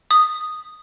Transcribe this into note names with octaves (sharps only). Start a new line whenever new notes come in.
D#6